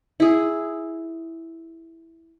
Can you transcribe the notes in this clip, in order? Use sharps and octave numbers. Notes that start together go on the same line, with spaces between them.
E4 G#4